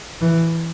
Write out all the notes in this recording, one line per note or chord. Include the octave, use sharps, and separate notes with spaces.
E3